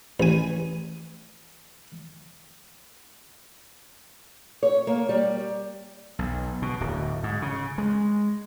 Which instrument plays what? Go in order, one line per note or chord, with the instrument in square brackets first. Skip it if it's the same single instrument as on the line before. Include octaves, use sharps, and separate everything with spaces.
[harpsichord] A1 G#5
[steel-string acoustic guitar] C#5
A#3
G3
[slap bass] B1
B2
D1
G#2
C#3
G#3